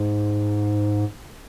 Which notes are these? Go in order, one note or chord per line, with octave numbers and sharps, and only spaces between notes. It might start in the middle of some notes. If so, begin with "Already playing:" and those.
Already playing: G#2